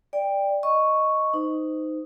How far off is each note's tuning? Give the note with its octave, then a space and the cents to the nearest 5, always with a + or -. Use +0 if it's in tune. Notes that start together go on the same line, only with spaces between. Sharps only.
D5 +0 G5 +15
D#5 +0 C#6 +0
D#4 +0 C5 -30